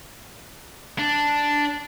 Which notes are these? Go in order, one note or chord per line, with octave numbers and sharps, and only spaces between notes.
D4